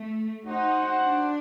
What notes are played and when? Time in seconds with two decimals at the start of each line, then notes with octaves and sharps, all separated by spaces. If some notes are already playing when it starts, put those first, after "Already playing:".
Already playing: A3
0.46 D#4 F#4 C5 F#5
1.01 D4